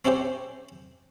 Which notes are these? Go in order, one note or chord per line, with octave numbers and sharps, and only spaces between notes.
C4 C#4 E4 G4 C5